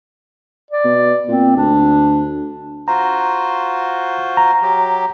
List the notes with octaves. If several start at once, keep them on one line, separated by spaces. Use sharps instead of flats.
D5
B2
A#2 C4
D2 D4
F4 F#4 C5 A#5
A#5
F#3 G4